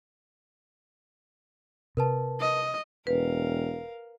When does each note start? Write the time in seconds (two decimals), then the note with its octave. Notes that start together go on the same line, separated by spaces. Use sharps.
1.97 C3 A#4 B4 A5
2.41 D#5
3.07 E1 A#4 B4 F5